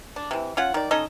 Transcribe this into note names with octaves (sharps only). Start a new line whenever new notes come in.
D4
C3 E3
C#4 F4 F#5
D#3 D5
C#4 D#4 A4 D#5